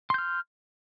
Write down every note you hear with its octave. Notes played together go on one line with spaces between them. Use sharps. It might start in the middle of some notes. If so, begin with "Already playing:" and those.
C6 F6 G6